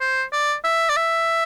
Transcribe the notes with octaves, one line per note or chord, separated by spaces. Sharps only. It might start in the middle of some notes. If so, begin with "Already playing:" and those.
C5
D5
E5
D5
E5